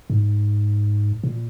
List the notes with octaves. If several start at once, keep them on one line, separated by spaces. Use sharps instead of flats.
G#2
A#2